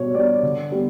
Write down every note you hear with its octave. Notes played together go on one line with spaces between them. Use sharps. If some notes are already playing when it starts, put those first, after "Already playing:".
Already playing: B2 G3 B3 D4 C#5
G3 B3 D4 D5
D3
G3 B3